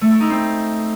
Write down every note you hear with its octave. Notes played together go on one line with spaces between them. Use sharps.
A3
E4
D#4
C4